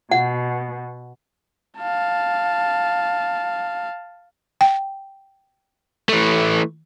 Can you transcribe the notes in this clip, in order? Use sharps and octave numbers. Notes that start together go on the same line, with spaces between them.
B2 F#5
F5 A5
G5
E3 A3